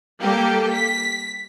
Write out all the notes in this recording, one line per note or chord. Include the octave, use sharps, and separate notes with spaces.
G3 A#3 G4 A4
B6